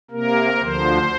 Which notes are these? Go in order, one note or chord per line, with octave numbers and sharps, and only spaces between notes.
C3 A#3 A#4
D2 D3 F3 C5